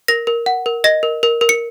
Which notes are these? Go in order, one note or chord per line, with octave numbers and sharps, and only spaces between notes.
A#4 A#6
A#4
F#5
A#4
D#5 A#6
A#4
A#4
A#4
C#7